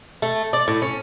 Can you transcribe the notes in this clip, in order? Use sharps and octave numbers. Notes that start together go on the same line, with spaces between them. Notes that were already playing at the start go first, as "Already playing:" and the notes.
A3
D5
A2
C#4